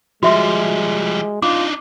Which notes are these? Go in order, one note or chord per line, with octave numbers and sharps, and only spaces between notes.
F3 G3 G#3 F#4 E5 C6
D4 D#4 F4 D6